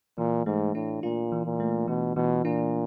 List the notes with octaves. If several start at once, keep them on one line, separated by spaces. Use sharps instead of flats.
A#2 E3
G#2 A3
A2 D4
A#2 F4
E3
A#2
A3
B2 E3
B2 E3
A#2 D4